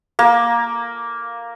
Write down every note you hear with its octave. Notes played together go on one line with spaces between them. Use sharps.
A#3